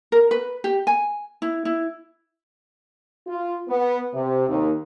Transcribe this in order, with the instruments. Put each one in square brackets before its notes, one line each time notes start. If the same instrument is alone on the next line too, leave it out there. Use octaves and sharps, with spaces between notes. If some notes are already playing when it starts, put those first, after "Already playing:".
[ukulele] A#4
B4
G4
G#5
E4
E4
[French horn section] F4
B3
C3
D#2